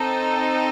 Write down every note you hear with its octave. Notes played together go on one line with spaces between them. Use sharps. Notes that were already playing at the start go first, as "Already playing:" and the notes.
Already playing: C4 D#4 A4